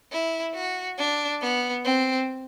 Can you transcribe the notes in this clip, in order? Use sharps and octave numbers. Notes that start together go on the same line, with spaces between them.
E4
F#4
D4
B3
C4